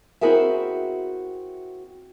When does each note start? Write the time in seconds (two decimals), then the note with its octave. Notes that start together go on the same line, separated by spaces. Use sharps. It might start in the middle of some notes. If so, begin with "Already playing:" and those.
0.21 C4 E4 F#4 G#4 A#4 E5